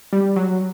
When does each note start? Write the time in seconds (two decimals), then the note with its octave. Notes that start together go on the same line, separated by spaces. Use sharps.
0.13 G3
0.36 F#3